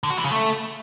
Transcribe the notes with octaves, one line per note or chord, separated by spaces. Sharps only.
D3
F#4
E3
C#3
A3